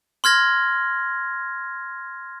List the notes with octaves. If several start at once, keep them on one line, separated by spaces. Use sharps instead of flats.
C6 F6 G#6 A#6